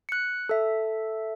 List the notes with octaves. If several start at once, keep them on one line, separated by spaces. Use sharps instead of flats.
F#6 C#7
A4 E5